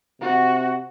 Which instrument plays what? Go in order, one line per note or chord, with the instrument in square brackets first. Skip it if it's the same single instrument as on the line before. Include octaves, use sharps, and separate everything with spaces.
[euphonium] C3 [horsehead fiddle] F#4